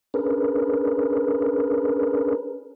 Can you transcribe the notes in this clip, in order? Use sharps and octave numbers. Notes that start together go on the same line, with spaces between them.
C#4 D4 G#4 A#4 B4